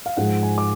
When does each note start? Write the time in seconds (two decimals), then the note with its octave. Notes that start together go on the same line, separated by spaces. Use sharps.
0.06 F5
0.17 G#2 F3 G#3 F#5
0.43 G#5
0.58 D6